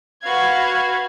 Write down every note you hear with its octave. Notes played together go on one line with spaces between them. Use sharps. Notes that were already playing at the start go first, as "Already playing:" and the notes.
F#4 B4 F5 G#6